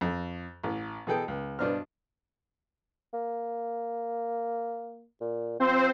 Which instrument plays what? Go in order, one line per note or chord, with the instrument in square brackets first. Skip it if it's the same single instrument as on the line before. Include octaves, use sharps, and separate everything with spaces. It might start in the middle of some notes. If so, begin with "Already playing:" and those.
[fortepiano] F2
A1
B2 E3 G#4 A4 G5
C#2
G2 B2 D4 C5 F6
[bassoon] A#3
A#2
[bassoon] F3 [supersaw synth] C4 C5